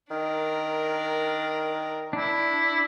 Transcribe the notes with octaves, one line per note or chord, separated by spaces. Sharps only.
D#3 D4 A#4
D4 E4